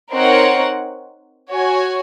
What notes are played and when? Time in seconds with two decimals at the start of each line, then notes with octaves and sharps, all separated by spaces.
0.11 C4 D#4 A#4 C#5 F#5
1.52 F#4 C#5 G#5